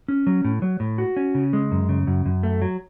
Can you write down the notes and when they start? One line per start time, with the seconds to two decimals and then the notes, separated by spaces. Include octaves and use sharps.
0.08 C#4
0.27 F#3
0.45 A2
0.62 F#3
0.80 A2
0.98 F#4
1.17 C#4
1.35 C#3
1.53 G#3
1.72 F#2
1.89 C#3
2.07 F#2
2.26 F#2
2.43 A3
2.62 F#3